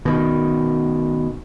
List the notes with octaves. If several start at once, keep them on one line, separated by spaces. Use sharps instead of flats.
B2 D#3